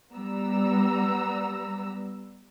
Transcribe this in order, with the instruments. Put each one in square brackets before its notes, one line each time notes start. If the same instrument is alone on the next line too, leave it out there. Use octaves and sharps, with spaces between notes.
[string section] G3 B3 A#5 E6